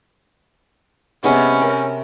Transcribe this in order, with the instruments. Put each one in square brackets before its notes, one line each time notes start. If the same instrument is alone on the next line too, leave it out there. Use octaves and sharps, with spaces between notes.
[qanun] C3 G#3 B3 [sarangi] C#4
[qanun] A#4